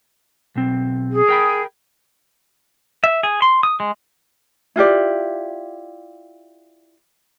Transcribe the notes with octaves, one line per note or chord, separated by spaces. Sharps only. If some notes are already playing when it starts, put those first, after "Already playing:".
B1 C4
G#4
A#4 G5 B5
E5
G#4
C6
D#6
G#3
E4 F4 G4 D5